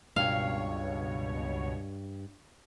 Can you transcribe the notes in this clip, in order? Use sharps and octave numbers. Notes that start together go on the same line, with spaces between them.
C#2 G2 B2 C#5 F5